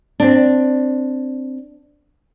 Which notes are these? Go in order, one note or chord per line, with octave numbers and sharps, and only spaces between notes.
C4 D4